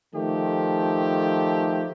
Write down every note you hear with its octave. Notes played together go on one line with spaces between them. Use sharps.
D#3 F3 A3 G4